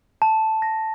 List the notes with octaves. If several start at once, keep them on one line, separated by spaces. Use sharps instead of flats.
A5
A#6